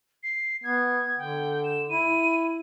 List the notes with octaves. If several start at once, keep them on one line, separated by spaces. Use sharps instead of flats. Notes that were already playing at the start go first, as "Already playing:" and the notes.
C7
B3 G#6
D3 G5
E7
E4 D#7